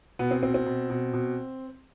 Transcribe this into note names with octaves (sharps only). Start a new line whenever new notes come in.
B2 B3
C4
B2 C4
C4
B2
B2
B2